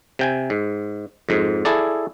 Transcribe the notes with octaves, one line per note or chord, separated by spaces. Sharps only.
C3 G5 G#5
G#2
F2 G#2
E4 G#4 A4 D5